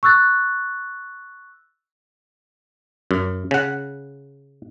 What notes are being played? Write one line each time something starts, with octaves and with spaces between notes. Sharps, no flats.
C#6 E6 F#6 A6
F#2
C#3 F#5